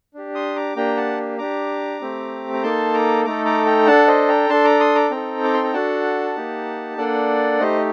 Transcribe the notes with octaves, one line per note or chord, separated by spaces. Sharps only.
D4 G4
C6 D#6
A#5 D6
A#3 D4 G4 G5 A#5
F#5 A5
D4 G4 A#5 D6
A3 C4 G4
A#5
A#3 D#4 A4 A5 C6
A#5 D6
A3 D#4 A4 A#5 D6
A#5 D6
G5 A#5
D4 A4 F#5 A5
C5 D#5
G5 A#5
D4 A4 A5 C6
A#5 D6
C6 D#6
A#5 D6
C4 D#4 A4 G5 A#5
D6
C6
A#5
D4 F#4 A4 F#5 A5
A#3 D#4 G4
A#3 D4 A4 D5 F#5
A3 D#4 G4 C5 D#5